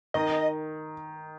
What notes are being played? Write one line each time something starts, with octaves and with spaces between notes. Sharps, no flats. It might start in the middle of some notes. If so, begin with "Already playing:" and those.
D#3 D#5